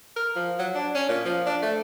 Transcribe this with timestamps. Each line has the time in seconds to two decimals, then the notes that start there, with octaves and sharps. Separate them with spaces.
0.17 A#4
0.36 F3
0.59 F#3
0.75 D4
0.95 C#4
1.09 A#2
1.26 F3
1.46 D4
1.62 A3